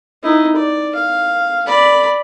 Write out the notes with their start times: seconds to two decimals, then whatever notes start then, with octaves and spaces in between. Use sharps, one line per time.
0.23 D#4 E4
0.56 D5
0.95 F5
1.67 D5 B5